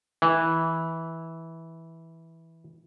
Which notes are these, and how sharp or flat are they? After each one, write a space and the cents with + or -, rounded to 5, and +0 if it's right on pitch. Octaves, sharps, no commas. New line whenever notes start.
E3 -10